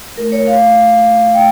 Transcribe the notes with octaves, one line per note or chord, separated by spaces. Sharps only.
A3 E4 A#4
C#5
F5
A3 G5